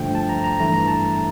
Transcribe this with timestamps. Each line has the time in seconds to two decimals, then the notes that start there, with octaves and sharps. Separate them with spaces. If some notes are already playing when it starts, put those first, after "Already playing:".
Already playing: G2 D3 F3 A3 G5
0.15 A5
0.29 A#5
0.44 A#5
0.59 G2 E3 A3 E4 A#5
0.74 A#5
0.88 A5